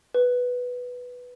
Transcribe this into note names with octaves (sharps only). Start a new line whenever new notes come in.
B4